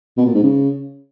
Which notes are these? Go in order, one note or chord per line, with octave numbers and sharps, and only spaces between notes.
B2
A#2
G#2
C#3